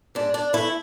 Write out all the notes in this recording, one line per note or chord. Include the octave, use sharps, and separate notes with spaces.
G#2 D4
D4
E3 A3 E4